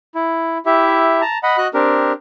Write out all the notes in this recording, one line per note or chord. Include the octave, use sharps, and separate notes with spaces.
E4
E4 G4 E5
A5 A#5
D#5 F#5 B5
F#4 D#5 F#6
C4 D4 G4 A#4